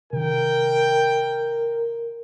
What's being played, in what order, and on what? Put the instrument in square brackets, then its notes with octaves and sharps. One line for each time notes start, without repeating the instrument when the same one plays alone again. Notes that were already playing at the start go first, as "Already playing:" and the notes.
[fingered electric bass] C3 D#3 [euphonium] A#4 [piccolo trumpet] G5